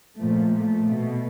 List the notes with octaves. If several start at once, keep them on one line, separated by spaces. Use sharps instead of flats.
A#2 F3 A3
A3
B2